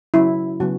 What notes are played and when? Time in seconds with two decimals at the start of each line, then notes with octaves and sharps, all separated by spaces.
0.14 C#3 F#3 C#4 E4
0.60 C#3 F#3 B3 F#4